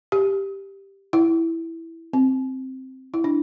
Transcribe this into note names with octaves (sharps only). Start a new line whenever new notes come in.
G4
E4
C4
E4
D4